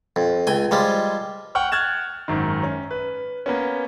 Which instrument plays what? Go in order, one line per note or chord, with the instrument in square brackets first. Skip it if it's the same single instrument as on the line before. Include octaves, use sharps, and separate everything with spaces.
[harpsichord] F2
C#2 G5 G#5
F3 G3 G#3
[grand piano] F#5 G5 C#6 F6
F6 F#6 G#6 A6 E7
G#1 F#2 D#3
C#4
B4
A#3 B3 C#4